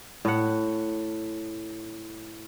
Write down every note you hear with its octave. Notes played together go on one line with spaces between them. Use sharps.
A2 F#5